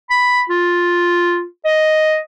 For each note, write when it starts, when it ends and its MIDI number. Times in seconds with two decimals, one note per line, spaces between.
0.10 0.42 83
0.49 1.44 65
1.65 2.18 75